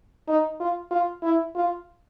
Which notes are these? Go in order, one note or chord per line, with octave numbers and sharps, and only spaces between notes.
D#4
F4
F4
E4
F4